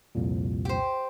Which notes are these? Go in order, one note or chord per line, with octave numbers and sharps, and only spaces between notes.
C2 F2 A#2
G4 C5